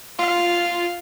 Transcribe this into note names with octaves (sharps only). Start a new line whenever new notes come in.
F4 F5